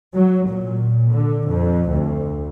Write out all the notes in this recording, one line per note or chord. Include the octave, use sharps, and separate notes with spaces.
F#3
A#2
D3
F2
D2